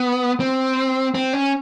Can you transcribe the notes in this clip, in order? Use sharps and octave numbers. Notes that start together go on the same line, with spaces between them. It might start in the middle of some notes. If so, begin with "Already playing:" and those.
Already playing: B3
C4
C4
C#4